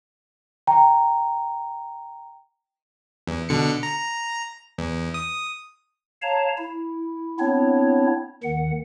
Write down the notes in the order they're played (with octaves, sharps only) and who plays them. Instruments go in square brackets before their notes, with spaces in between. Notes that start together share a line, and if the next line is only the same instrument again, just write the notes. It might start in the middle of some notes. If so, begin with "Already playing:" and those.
[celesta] G5 A#5
[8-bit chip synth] E2
B2 D3 C#7
A#5
E2
D#6
[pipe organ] C#5 F5 A5 A#5
E4
B3 C4 D4 E4 C#5
D#2 D#3 F#5